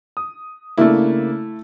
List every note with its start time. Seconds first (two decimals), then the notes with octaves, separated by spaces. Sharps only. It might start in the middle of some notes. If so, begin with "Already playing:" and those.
0.17 D#6
0.78 C#3 A3 A#3 D4 E4